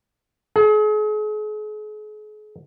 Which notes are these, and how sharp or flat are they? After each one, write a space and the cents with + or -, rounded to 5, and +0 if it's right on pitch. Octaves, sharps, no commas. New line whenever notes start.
G#4 +40